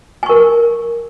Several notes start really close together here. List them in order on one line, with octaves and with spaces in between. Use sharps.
G#5 C#6 A#4